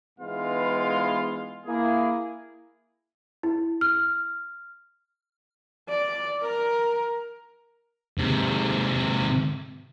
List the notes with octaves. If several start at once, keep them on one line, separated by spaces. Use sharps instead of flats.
G#2 E3 G#3 B3 F4 F5
A#3 E4 G#4
E4
F6
D5
A#4
G#2 C3